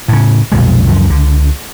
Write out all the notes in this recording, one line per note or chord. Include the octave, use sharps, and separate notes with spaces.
A2 C#3
B1 F2 A#2 G#3
C#2 F#2 F3
C#2 D3